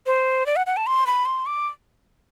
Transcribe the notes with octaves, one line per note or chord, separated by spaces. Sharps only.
C5
D5
F#5
F#5
A5
C6
B5
C6
D6